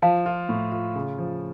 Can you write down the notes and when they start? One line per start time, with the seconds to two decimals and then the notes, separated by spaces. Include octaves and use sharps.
0.02 F3 F5 A5
0.26 F4
0.49 A2
0.72 F4
0.96 C#3
1.18 F3